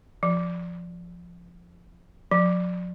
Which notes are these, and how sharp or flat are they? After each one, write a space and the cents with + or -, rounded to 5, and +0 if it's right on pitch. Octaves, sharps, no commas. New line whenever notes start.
F3 -5
F3 +45